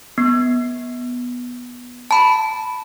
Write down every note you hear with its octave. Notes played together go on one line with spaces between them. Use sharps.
B3
A5 B5